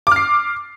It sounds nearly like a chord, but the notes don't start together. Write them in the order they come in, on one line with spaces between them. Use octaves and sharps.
D6 F6 C7